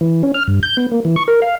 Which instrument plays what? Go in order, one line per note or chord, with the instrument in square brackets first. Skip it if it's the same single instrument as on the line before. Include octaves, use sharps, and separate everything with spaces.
[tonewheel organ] E3
C#4
F6
G2
G6
B3
A#3
E3
C#6
A#4
F5